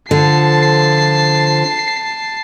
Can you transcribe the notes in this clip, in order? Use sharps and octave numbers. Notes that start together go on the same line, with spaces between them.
D3 F3 A5 C7